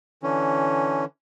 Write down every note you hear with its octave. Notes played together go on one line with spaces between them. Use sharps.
D3 E3 C#4